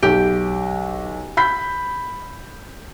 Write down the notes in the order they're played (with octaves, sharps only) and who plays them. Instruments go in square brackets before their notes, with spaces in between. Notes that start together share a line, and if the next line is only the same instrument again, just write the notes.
[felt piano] B1 [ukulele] G4
[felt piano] B5 G6 B6